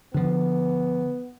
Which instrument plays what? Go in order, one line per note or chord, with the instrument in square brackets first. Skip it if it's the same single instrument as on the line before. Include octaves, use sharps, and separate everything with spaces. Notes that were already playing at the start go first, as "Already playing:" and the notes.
[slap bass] D3 F3 [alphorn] B3